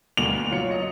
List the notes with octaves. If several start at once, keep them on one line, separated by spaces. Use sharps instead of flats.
D2 B2 A#3 F7
F#3 F4 C#5 C#7
D#5